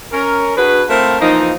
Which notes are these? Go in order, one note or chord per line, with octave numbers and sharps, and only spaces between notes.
C#4 A#4
D4 F#4 G#4 B4
A3 C4 E4 A#4 C5 F5
E3 F3 A#3 D#4